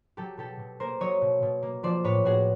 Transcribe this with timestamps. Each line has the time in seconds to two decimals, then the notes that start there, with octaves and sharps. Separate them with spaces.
0.17 F#3 G4 A4
0.37 B2 G4 A4
0.59 B2
0.80 A#3 A#4 C5
1.00 F#3 C#5 D#5
1.22 B2
1.42 B2
1.63 A#3
1.83 F3 C5 D5
2.04 A2 B4 C#5
2.24 A2 F#4 G#4